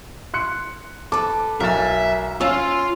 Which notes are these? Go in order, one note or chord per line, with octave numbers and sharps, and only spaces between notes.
C6 F#6 C#7
A4 B4 D6
B1 A#4 E5 G#5 A6
C#4 F4 F5 E6